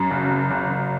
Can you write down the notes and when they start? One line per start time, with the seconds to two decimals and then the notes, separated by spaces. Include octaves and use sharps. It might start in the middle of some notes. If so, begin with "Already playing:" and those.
Already playing: F#2
0.11 F#1
0.31 F#1
0.51 F#1
0.70 F#1